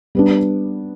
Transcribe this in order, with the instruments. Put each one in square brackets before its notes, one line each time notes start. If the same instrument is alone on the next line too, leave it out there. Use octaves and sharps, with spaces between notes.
[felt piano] G3 B3 D4